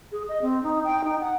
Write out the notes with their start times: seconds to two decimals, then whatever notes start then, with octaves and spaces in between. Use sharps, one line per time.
0.12 G#4
0.29 D#5
0.42 C4
0.63 D#4
0.84 G5
1.04 D#4
1.20 F#5